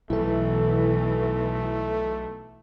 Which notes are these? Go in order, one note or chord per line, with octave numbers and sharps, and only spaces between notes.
B1 B2 E3 A3 E4 A4